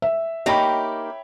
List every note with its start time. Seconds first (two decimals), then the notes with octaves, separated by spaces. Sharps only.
0.02 E5
0.46 A#3 D#4 G4 C#5 G5 B5